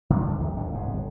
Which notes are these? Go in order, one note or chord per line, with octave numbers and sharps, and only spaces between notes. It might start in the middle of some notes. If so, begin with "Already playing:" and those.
D3 D#3 D4
F2
E2 D#3 F#3 A3
G1 D#2 A2 D4
D1 C2 G#2 B2
G1